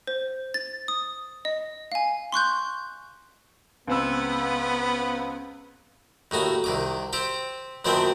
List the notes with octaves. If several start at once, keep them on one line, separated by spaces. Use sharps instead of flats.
C5
A6
D#6
D#5
F5 G#5
C6 C#6 F#6 G6
C#2 B3 C4 E6
D#2 A2 D#4 F#4
C2 D#3 D6
C4 G4 G5
F#2 A#2 D#3 B3 C4 D4